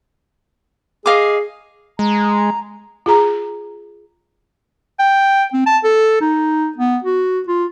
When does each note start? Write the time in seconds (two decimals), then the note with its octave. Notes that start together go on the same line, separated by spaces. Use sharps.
1.06 G#4 D#5 F5 D6
1.99 G#3 A#5
3.06 F4 G#4 A#5
4.99 G5
5.54 C4
5.66 A5
5.84 A4
6.21 D#4
6.78 B3
7.04 F#4
7.48 F4